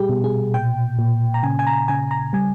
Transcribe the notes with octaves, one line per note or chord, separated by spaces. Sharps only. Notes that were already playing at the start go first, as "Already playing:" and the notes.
Already playing: A#2 G3 G4 G#4
B2
G#4
A#2 G5
A#2
A#5
C#3 G#5
G#5
A#5
C#3 G#5
A#5
G3 G#5